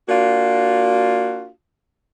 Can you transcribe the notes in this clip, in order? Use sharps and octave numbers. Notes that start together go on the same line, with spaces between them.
A#3 D4 F4 F#4